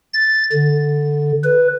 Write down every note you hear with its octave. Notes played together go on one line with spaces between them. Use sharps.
A6
D3
B4